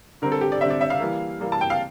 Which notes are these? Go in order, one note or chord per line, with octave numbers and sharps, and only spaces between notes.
D3 G3 C4 A#4
A4
G4
D5
D3 G3 C4 E5
D5
E5
F5
E3 G3 A#3
E3 G3 A#3
A5
G5
F5